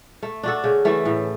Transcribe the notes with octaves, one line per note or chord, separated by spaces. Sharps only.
A3
D4 F#4 A4
C#3
E3 A3
A2